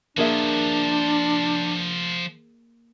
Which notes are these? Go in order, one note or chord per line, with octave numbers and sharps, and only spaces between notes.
F3 A#3 D4 F#4 G#4 E5